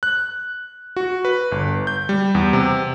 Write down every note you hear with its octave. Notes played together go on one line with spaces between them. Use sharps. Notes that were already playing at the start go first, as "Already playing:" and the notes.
F#6
F#4
B4
G1
G6
G3
E2
C3